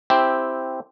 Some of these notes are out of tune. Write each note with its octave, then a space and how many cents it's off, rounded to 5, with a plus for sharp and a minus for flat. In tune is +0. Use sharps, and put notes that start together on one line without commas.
C4 +0 E4 +0 G4 +0